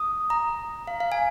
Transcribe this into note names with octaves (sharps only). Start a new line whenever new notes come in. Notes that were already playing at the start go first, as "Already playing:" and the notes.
Already playing: D#6
A#5
F5
F5
G#5